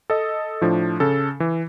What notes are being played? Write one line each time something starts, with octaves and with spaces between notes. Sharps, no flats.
A4 D#5
A2 F3 D4
C#3 A4
E3